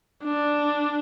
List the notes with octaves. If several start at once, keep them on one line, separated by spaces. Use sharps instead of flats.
D4